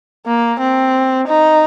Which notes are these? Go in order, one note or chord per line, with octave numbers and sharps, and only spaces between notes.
A#3
C4
D#4